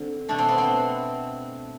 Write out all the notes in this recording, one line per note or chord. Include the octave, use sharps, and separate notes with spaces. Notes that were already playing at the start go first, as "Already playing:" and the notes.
Already playing: D3 C4
B2 A3 D4
C4
B3
C4